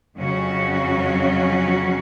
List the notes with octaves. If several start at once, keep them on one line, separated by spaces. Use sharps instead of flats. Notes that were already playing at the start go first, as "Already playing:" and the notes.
F2 C#3 F#3 C#4 F#4